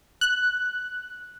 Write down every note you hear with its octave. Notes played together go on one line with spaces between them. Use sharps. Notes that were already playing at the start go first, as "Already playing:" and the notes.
F#6